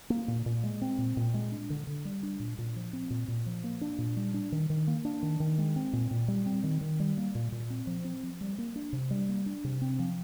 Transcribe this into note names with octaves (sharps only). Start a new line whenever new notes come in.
A#3
A#2
A#2
G#3
C4
A#2
A#2
G#3
D4
D3
D3
G3
D4
A#2
A#2
F3
C4
A#2
A#2
F3
A#3
D4
A#2
G3
D4
D#3
D#3
A#3
D4
D#3
D#3
G#3
C4
A#2
A#2
G3
C4
D#3
D#3
G3
A#3
A#2
A#2
C4
F3
C4
F3
G3
A#3
D4
C3
G3
A#3
D4
C3
C4
F3